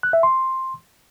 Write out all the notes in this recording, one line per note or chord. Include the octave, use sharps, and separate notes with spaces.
F#6
E5
C6